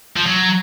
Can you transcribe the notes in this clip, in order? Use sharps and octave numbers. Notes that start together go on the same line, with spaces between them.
F3
F#3